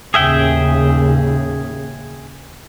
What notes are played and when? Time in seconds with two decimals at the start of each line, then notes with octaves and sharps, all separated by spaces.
0.14 D#2 A2 C#3 G#4 E5 G5